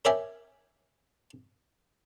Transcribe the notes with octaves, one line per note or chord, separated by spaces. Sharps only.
A#4 C#5 D5 E5 G5 G#5